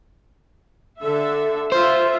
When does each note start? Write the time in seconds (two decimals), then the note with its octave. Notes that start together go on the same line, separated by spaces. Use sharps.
1.01 D3 A4 E5
1.72 F4 C5 E5